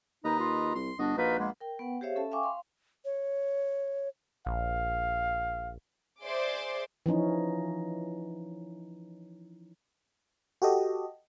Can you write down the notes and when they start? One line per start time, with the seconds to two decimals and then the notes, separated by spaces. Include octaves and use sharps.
0.24 D#2 D#4 B4 D#5 A#5
0.40 F4
0.75 C2 C6
0.99 G1 D4 F#4 D#5
1.17 A#1 D#4 F4 F#4 B4
1.39 G#3 A#3 B3
1.61 A#4 G5
1.79 B3 B4 F#5 G5
2.01 G4 G#4 C5 C#5 E5 F5
2.16 C#4 A4 E5 A5
2.31 E5 F5 G5 G#5 C#6 D6
2.43 F5 C6
3.05 C#5
4.46 A#1 F5
6.23 G#4 C5 D5 E5 C6 D6
7.06 E3 F3 C#4 D#4
10.62 F#4 G4 A4 D#5